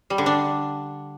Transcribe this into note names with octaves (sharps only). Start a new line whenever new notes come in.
G3
D3
D4